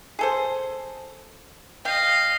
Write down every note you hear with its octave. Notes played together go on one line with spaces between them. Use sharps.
G#4 A4 C5
D#5 F5 G5